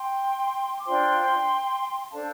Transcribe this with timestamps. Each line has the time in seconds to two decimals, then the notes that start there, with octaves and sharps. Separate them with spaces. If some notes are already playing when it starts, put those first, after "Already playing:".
Already playing: G5 C6
0.77 D6
0.84 D4 F4 C5 G5 C6
2.10 D4 A4 C5 F5 A5